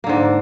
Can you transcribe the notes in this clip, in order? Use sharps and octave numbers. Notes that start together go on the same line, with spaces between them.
G#2 D3 A#3